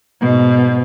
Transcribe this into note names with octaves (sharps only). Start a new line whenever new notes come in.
G#2 B2